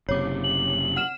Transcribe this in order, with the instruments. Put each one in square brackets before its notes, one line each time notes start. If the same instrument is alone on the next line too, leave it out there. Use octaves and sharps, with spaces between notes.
[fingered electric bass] F#1 C3 [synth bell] C#5 D6
[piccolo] F#7
[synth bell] F#5 F6 E7